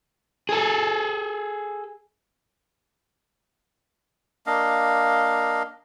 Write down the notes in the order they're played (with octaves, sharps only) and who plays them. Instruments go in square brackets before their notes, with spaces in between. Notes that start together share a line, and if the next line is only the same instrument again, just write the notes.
[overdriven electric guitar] G#4 A4
[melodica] A#3 D4 D#5 F5